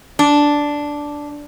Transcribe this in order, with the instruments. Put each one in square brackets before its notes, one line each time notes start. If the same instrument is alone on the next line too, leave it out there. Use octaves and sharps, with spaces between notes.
[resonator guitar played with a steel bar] D4